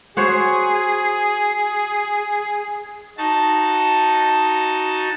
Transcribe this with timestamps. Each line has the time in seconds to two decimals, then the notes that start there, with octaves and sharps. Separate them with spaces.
0.17 F#4 G#4 C5 C#5
3.18 D#4 F#4 A5